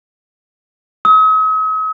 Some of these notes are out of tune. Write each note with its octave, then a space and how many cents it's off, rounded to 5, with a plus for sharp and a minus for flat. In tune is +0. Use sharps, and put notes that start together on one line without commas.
D#6 +45